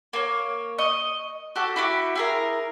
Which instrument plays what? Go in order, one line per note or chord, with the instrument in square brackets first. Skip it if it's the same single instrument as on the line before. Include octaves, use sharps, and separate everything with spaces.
[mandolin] A#3 C#5
D#5 C#6
F#4 G4 A4
E4 F#4 G4
E4 G#4 A#4